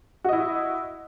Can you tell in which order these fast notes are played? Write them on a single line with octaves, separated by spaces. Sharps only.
F#4 D#5 E4